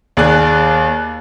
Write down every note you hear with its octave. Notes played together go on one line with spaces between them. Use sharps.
D#2 G#4 D5 F#6